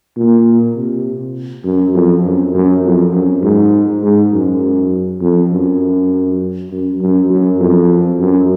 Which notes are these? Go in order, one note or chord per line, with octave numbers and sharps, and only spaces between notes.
A#2
C3
F#2
F2
F#2
F#2
F2
F#2
G#2
G#2
F#2
F2
F#2
F#2
F#2
F#2
F2
F#2